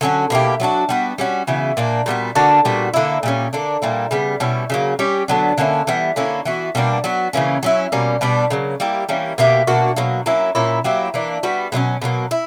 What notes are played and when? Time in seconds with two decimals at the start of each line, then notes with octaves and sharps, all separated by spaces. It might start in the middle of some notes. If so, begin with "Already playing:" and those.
0.01 D3 F#3 C#4 F#4
0.30 B2 A#3 E4 G4
0.60 F#3 B3 D4 F#4
0.89 G3 B3 F#4
1.18 G3 C#4 F#4
1.47 C#3 E3 B3 F#4
1.77 A#2 A#3 D4
2.06 A#2 G3 B3 F#4
2.35 D3 A#3 D4 F#4
2.65 A#2 G3 B3 F#4
2.94 D3 A#3 E4
3.23 A#2 G3 C#4
3.53 D3 A#3 D4
3.82 A#2 G3 A#3 E4
4.11 C#3 G3 B3
4.40 B2 G3 C#4 E4
4.70 C#3 F#3 A#3
4.99 G3 C#4 G4
5.28 D3 F#3 B3 D4
5.58 D3 A#3 C#4 E4
5.87 E3 G3 B3
6.16 D3 A#3 C#4 E4
6.45 E3 B3 F#4
6.75 B2 G3 A#3 D4
7.04 F#3 B3 F#4
7.33 C#3 E3 A#3 C#4
7.63 F#3 C#4 E4
7.92 B2 G3 A#3 C#4
8.21 B2 G3 B3 D4
8.50 C#3 F#3 A#3
8.80 G3 A#3 E4 G4
9.09 E3 G3 A#3 C#4
9.38 B2 A#3 E4 G4
9.67 B2 A#3 D4 F#4
9.96 B2 F#3 A#3
10.26 F#3 A#3 C#4 E4
10.55 A#2 A#3 C#4 E4
10.84 F#3 A#3 E4 G4
11.14 E3 A#3 D4
11.43 G3 B3 F#4
11.72 B2 F#3 A#3 C#4
12.02 B2 F#3 A#3
12.31 E4